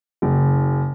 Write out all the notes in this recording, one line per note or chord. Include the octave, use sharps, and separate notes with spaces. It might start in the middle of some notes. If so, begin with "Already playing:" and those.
F#1